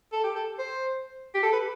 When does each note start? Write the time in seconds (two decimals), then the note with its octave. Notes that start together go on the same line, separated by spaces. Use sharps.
0.12 A4
0.24 G4
0.36 A4
0.59 C5
1.34 G4
1.43 A4
1.53 B4